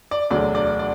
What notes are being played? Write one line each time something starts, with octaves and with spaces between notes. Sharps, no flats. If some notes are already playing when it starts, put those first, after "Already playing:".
D5
E1 D2 D3 F#3 D5
D5
D5